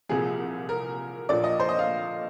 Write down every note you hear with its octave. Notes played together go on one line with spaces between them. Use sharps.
C2 A#2 F3 G#4
A#4
A#1 A#2 F3 D5
D#5
C5
D#5
F5